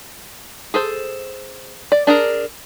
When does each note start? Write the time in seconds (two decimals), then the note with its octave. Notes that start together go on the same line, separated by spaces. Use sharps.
0.74 G#4 A4 C5
1.92 D5
2.07 D4 G#4 A#4